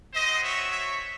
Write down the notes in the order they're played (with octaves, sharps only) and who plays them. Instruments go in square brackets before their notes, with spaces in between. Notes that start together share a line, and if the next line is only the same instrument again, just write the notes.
[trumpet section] C4 F#4 C5 D#5
C#5 E5
C#5 E5